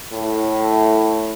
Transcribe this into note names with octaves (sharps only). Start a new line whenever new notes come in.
A2